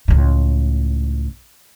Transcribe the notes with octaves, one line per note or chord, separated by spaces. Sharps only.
C#2 A2